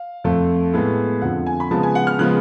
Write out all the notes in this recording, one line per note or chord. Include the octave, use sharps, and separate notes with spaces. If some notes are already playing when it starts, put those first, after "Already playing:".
Already playing: F5
F2 F3 A3
A2 G#3 B3
F2 D3 F3 F#5
G#5
B5
C#3 F3 G#3 B3 A5
G#5
F#5
F6
C#3 F3 G#3 B3 F#6